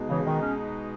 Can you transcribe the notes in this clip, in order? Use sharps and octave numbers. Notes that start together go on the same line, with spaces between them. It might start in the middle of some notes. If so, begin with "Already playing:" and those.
Already playing: B2 G#3 D#4
C#3 E3
D#3
C#4